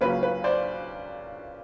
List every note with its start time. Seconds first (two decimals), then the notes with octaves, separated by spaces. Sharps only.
0.01 C#2 C#3 F#3 A#3 C#4 B4
0.23 B4
0.44 C5 D5